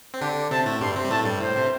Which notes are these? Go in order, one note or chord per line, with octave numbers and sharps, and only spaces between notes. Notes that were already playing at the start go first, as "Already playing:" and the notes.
C4
D3 D4 G4
C3 C4 A5
A2 A3
G2 G3 C6
C3 C4
G3
A2 A3 A5
G2 G3
A2 C5
C3